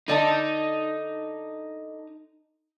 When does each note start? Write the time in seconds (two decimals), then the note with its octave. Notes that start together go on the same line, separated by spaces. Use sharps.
0.08 D3 D#4 D5 A5